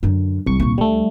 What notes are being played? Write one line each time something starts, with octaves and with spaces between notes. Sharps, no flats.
F#2 D3
C2 G3 C#6
D#1 A#3
D2 G3 A3